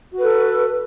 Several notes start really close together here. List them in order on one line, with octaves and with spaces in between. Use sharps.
F#4 B4 A4